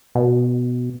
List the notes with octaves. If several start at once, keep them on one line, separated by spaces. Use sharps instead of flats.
B2